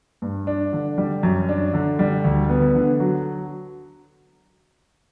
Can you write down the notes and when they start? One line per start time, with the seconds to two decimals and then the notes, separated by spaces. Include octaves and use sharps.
0.22 G2
0.47 D4
0.73 D3
0.98 G3
1.23 F#2
1.49 D4
1.73 D3
1.99 G3
2.24 D2
2.49 B3
2.75 D3
3.00 F#3